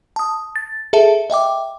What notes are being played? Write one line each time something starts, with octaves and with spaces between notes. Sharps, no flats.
A5 D#6
A6
G#4 A4 E5 A5
D#5 E5 G5 D6